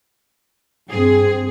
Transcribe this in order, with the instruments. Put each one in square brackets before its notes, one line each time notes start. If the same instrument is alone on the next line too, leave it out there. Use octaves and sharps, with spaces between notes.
[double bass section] G2 C4 [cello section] G#4